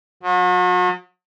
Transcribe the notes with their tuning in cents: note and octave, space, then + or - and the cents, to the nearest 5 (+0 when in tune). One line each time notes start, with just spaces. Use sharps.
F#3 -40